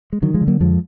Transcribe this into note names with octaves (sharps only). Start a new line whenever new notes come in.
G#3
D3 D#3 F#3
F3 G#3
D3
F#3 A#3
F2 F3 G#3